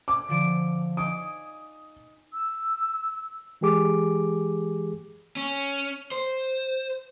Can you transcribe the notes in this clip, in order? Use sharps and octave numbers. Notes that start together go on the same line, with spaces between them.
G#5 D6
D3 F3 D7
D#4 G#5 D6 D#6
E6
E3 G#3 G4 G#4 D6
C#4
C5